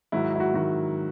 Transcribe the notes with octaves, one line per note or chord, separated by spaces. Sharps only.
G#2 D#3 F#3 E4
E4
F#4
G#2 D#3 F#3 F#4